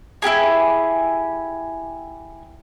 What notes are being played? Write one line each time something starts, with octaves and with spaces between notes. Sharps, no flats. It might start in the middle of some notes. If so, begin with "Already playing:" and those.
E4 F4 G4 G#4